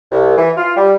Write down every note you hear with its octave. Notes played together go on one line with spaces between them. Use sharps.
C2
E3
F4
G3